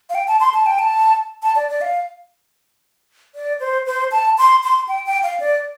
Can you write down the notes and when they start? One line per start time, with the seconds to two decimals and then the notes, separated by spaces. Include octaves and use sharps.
0.10 F5
0.15 G5
0.28 A5
0.40 C6
0.54 A5
0.66 G5
0.79 A5
1.43 A5
1.55 D5
1.69 D5
1.81 F5
3.35 D5
3.60 C5
3.86 C5
4.12 A5
4.38 C6
4.64 C6
4.88 G5
5.06 G5
5.23 F5
5.40 D5